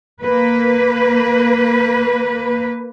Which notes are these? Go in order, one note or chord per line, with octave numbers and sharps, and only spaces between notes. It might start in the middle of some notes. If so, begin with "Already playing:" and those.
A#3 B4